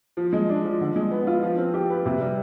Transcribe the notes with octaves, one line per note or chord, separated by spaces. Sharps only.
F3
G#3
D4
F3
D3
G#3
B3
F4
F3
C4
G4
B4
C3
G3